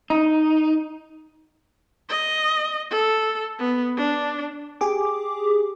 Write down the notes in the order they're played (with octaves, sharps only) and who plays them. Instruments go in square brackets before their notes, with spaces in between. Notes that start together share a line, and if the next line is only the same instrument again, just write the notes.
[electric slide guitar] D#4
[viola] D#5
A4
B3
D4
[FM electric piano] G4 G#4 D6